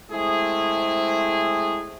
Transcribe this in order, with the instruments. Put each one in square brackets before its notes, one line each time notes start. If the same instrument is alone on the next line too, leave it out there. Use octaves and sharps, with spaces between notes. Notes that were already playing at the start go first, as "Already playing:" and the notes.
[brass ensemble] G#3 A3 C4 E4 G#4